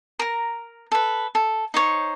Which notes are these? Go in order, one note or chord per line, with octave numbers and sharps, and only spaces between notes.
A#4 A#5
A4 B4
A4
D#4 C5 C#5